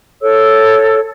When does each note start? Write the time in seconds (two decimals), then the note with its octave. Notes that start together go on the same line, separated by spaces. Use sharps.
0.22 A4 C#5 E6